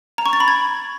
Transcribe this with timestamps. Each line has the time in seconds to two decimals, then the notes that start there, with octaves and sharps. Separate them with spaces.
0.18 A#5
0.26 C#6
0.33 A6
0.40 B5
0.48 G#6